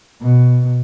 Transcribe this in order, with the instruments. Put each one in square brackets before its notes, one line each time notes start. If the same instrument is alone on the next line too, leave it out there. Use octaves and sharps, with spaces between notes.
[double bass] B2